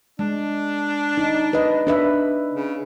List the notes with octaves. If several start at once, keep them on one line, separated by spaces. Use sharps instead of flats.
G#3 D4
D#4
B4 D#5
D4 B4 E5
C#3